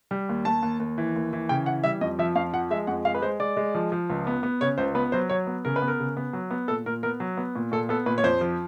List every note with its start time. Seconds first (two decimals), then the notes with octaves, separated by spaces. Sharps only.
0.11 G3
0.29 D#2
0.45 D#2 A5
0.62 D#2
0.80 D#2
0.98 E3
1.16 D#2
1.33 E3
1.49 C#3 G5
1.66 E3 F#5
1.84 G3 E5
2.01 F2 D#5
2.19 F3 E5
2.35 F2 F5
2.53 F3 F#5
2.71 G#3 E5
2.87 F2 F#5
3.05 G#3 F5
3.15 B4
3.22 G#3 C5
3.40 G#3 D5
3.57 G#3
3.75 F3
3.92 F3
4.10 C#2
4.27 B3
4.43 B3
4.61 C#3 C#5
4.78 C#2 C5
4.95 B3 B4
5.12 F#3 C5
5.29 F#3 C#5
5.47 B3
5.65 C#3 A#4
5.76 B4
5.82 B3
5.88 A#4
6.00 C#3
6.17 B3
6.33 F#3
6.51 B3
6.68 A#2 A4
6.86 A#2 A#4
7.03 B3 A#4
7.20 F#3
7.37 B3
7.56 A#2
7.72 A#2 A4
7.89 B3 A4
8.06 A#2 B4
8.18 C#5
8.24 F2 C5
8.41 F3